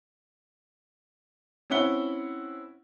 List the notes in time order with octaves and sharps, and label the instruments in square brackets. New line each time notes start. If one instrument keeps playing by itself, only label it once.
[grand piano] C4 C#4 E4 F#5 G7